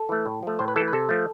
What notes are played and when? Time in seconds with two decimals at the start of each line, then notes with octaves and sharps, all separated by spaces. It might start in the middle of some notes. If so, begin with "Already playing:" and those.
Already playing: A4
0.09 E3 A3
0.26 A2
0.43 F3 A3
0.59 A2 C5
0.68 B4
0.76 E3 A4
0.80 A3
0.88 B4
0.93 C3 A4
1.09 F3 A3